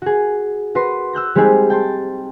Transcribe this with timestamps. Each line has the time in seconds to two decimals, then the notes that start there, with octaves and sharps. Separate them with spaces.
0.02 F#4 G#4
0.75 F#4 B4 C6
1.13 E6 F#6 G6 A#6
1.35 G3 G#3 C4 D#4 G4 G#4
1.70 G5 A5 C6